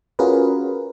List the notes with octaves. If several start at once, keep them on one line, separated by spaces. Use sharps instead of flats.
C#4 F4 F#4 G#4 A#4 B4